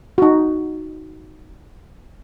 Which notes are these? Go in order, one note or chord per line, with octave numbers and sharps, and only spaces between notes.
D#4 F#4